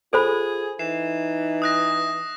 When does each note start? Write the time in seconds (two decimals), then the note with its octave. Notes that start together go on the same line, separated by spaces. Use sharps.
0.13 F4 G#4 A4 C5 B5
0.79 E3 D#4 C7 E7
1.62 D#6 F#6 A#6